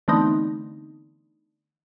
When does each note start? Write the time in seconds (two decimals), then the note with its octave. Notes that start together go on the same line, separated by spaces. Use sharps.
0.08 D3 E3 A3 B3 C4 D#4